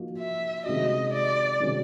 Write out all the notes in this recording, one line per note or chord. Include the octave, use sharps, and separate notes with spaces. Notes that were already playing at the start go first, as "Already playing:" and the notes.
Already playing: F3 A#3 D#4 F#4
E5
C3 D#3 G#3 C#4 F#4 D#5
D5
C3 D#3 G#3 C#4 F#4